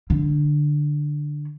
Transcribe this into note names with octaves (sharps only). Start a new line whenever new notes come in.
D3